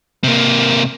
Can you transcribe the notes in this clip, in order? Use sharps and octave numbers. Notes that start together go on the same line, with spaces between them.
C3 A#3